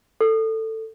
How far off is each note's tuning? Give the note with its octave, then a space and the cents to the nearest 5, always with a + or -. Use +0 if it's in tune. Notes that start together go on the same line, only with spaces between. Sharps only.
A4 +15